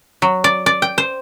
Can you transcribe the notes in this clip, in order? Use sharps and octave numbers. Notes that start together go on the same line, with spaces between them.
F#3
D5
D5
G5
C5